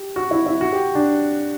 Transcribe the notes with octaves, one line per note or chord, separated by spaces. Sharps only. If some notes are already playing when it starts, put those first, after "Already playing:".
Already playing: G4
F#4
E4
E4
F#4
G4
D4